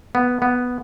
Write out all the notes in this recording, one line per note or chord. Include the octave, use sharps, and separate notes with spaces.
B3
B3